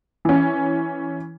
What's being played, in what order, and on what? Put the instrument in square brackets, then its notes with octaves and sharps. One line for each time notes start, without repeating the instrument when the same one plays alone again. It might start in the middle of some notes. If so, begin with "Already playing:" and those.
[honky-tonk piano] E3 C#4